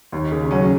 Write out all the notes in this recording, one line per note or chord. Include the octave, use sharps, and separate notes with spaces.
D#2
C#3
F#3 C#4